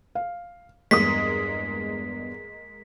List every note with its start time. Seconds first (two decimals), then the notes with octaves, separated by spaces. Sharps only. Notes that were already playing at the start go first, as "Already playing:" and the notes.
0.15 F5
0.91 E2 G2 G#3 A#3 D#6 B6